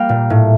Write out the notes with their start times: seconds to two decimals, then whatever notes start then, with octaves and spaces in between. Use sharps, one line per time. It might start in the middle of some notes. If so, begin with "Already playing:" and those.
Already playing: G3 A#3 F5 G5 F6
0.09 A#2
0.30 A2